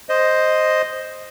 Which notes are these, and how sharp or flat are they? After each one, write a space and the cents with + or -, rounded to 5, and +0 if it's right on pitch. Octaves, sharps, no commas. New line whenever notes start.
C5 +0 D#5 +0